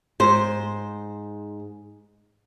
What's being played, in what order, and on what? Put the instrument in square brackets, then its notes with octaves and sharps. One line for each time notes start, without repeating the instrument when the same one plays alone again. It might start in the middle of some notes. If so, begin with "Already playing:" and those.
[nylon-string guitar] G#2 C5